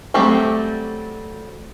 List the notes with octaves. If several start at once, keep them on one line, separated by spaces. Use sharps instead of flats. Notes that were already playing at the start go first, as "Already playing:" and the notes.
F#3 G3 A3 C4 G4